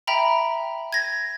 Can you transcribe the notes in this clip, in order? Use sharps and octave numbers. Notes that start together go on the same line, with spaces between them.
E5 G5 A#5 B5
G#6 A#6